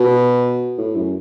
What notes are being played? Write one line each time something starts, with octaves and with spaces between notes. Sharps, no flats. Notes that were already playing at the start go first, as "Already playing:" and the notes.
Already playing: B2
A2
F#2